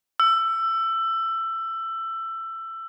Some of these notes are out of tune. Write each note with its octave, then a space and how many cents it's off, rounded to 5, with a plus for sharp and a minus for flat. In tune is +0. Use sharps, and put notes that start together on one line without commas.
E6 +20